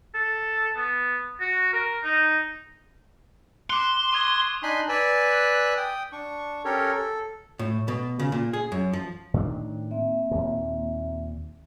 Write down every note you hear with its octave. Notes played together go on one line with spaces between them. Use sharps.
A4
B3
F#4
A#4
D#4
C6 D6 F#6
C#6 D#6 G#6
D4 D#4 G#5 B5 C6 F#6
B4 D5 G#5 E6 F#6
G5 D#6
D4 C#6
C#4 G4 A4 A#4 C#5
A4
A2
B2
C#3
A#2
G#4
F#2
F3
A2 D#3 D4
A#3 C4 E5
D#2 A#2